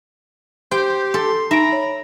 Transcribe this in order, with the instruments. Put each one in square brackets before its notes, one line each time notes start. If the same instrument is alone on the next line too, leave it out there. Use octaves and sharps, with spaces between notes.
[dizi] G4 [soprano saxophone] C5 [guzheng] G5
[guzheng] A4 [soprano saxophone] C6
[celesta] D#4 D7 [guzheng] E5 [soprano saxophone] A#5 [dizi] B5
[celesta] C#5